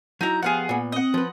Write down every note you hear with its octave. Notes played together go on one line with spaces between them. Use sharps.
F#3 D#4 E4 A#5
F3 B3 G4 G#4 F5 F#5
A#2 B3
C4 D#5 F#5
F3 B4